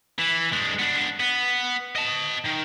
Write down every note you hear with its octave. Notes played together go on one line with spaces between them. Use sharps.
E3
G#3 D4
B3 D4
B3
D#5 A5
D#3